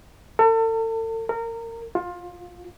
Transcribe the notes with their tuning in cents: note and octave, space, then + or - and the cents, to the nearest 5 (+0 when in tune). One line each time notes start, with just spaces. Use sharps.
A4 +40
A#4 -25
F4 +20